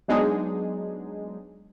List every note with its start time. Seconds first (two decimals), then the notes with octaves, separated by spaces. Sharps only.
0.08 F#3 G#3 B3 D4 D#4 G#4